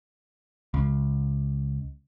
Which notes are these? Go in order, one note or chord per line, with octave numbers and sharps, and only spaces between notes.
C#2